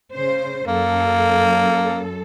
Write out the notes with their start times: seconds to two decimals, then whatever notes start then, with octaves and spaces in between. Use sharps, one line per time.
0.13 C#3 C5
0.68 F#2 A#3 A4